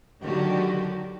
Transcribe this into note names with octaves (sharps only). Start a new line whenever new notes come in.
D3 D#3 F#3 F#4 G4